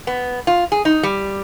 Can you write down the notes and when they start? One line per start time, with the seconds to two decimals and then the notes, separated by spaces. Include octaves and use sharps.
0.07 B3
0.47 F4
0.72 G#4
0.85 D#4
1.03 G3